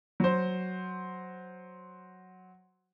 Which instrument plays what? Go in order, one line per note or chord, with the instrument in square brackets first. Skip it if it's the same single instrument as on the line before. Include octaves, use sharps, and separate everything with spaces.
[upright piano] F#3 C5